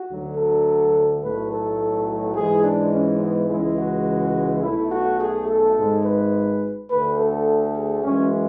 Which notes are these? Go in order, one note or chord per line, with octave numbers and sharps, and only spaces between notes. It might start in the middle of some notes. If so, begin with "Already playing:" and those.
Already playing: F#4
D2 D3 F#3
A4
B1 A2 F#3 A3 B4
A4
G#2 E3 G#3 G#4
D4
C#4
B3
C#2 C#3 E3 G#3 E4
F#4
B1 B2 A3 E4
F#4
G#4
A4
G#1 G#2 G#3
B4
D2 D3 A3 B4
A4
G#4
F#2 E3 G#3 C#4